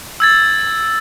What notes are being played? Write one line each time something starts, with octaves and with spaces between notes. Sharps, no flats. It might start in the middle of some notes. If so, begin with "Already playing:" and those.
E6 G#6 A6